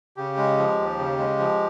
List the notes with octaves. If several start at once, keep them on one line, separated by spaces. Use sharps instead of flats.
C#3 G4
G#3
F3
D#2
C#3
G#3
F3